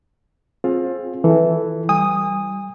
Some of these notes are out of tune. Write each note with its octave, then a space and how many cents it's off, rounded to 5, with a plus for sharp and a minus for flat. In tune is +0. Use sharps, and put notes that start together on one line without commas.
C4 +25 F4 +20 G#4 +15
E3 +0 A4 +0
G3 -15 G#5 -35 D#6 +0